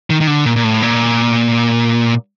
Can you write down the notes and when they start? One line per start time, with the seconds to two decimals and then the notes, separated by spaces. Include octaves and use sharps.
0.10 D#3
0.21 D#3
0.27 D3
0.46 A#2
0.56 A#2
0.64 A2
0.82 A#2